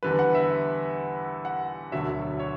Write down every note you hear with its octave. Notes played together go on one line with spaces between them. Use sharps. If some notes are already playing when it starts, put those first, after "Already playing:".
E2 D3 G3 B4
F#5
E5
F#5
E1 D2 D3 F#3 E5
C#5